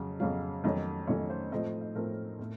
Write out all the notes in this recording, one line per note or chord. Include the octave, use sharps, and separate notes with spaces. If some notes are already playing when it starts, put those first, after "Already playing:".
Already playing: F2 C#3 F#3
F2 C#3 F#3 F5
F2 D#3 F#3 A3 C#4 D#5
F2 D#3 F#3 A3 C#4 C#5
C5
A2 F3 A3 C4 D#5
D#5
A2 F3 A3 C4 A#4
A2